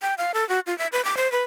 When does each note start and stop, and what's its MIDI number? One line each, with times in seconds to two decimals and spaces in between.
0.02 0.14 79
0.18 0.32 77
0.34 0.47 69
0.49 0.60 66
0.67 0.77 65
0.78 0.87 76
0.93 1.04 71
1.05 1.17 86
1.17 1.30 72
1.32 1.43 71